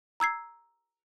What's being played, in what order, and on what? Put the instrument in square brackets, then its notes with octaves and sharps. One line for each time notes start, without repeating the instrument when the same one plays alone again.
[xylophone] A#5 E6 G#6 C7